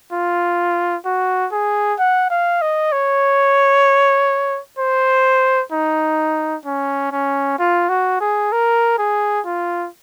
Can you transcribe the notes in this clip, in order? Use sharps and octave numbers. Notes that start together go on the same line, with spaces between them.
F4
F#4
G#4
F#5
F5
D#5
C#5
C5
D#4
C#4
C#4
F4
F#4
G#4
A#4
G#4
F4